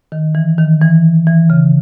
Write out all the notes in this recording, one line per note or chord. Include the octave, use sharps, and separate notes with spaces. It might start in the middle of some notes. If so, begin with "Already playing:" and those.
D#3
E3
D#3
E3
E3
C#3